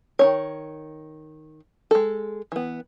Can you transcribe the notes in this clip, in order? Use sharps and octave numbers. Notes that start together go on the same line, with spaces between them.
D#3 C#4 C#5
G#3 A4
E3 B3